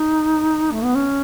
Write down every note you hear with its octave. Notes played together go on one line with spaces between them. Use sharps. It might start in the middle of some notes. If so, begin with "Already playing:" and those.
Already playing: D#4
A3
B3
C#4